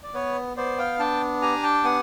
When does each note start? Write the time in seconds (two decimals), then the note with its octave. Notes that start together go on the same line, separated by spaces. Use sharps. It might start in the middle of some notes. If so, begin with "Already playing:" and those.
0.03 D5
0.14 B3 B4 C#5
0.57 B3 C5 D5
0.78 F5 G5
0.99 D4 G5 A5
1.42 G4 G#5 A#5
1.63 G5 A5
1.84 B3 F#5 G#5